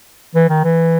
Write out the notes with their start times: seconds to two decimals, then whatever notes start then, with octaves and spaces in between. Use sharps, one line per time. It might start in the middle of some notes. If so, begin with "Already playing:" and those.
0.35 E3
0.49 D#3
0.64 E3